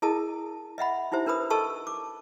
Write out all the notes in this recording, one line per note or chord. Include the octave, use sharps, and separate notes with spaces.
E4 G#4 A#4 D#5 A5 D#6
D#5 E5 F#5 B5
D#4 E4 G4 C5 E5
D4 A#4 B4 B5 D#6
A4 A#4 D#5 A5 C#6 E6
D6